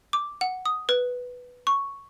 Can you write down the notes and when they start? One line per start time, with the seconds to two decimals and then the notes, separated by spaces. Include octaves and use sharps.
0.13 D6
0.41 F#5
0.66 D#6
0.89 B4
1.67 C#6